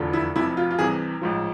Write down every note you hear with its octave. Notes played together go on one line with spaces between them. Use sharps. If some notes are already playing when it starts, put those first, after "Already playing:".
Already playing: F1 E2 D3 F3
E4
F1 F2 C3 E4
F4
F4
C2 C3 E3 G#4
A1 G#2 F3